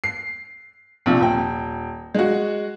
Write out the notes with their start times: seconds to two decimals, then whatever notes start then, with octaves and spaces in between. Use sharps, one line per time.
0.04 C7
1.06 A#1 C3 F3
1.21 D#1 G5
2.15 G#3 F#4